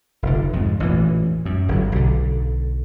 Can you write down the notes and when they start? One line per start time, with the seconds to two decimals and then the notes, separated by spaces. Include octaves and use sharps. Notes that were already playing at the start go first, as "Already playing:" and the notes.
0.23 F1 D3
0.53 F2 G#2
0.80 A1 A#2 E3
1.45 F#2
1.69 G1 F#3
1.92 B1 D3